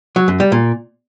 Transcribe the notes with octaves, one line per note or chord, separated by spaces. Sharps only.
F#3
F#2
G3
A#2